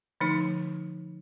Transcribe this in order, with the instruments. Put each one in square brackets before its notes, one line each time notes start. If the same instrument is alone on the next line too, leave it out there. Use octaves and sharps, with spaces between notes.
[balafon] D3 F3 A3 D#4